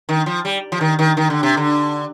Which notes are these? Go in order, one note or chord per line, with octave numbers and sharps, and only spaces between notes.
D#3
F3
G3
F3
D#3
D#3
D#3
D3
C3
D3